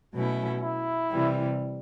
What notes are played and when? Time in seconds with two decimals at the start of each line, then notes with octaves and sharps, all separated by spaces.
0.13 B2 F#3 A3 C#4 E4
0.61 E4
1.10 C3 E3 G3